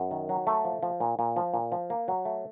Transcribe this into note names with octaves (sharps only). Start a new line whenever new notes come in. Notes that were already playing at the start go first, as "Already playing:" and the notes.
Already playing: F#2
D#3
F#3
A3
F3
F3
A#2
A#2
F3
A#2
F3
A#3
F#3
A3